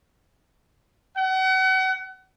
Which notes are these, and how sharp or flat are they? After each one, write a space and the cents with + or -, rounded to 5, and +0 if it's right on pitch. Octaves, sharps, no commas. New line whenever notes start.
F#5 +35